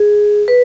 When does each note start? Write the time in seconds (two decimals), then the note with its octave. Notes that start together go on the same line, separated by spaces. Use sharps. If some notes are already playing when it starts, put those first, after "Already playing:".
Already playing: G#4
0.48 B4